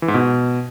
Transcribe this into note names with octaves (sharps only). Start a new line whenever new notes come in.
E3
G#2
B2